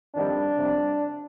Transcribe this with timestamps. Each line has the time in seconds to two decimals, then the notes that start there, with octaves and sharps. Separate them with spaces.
0.15 F2 D#3 G3 D4
0.58 F2 C3 G3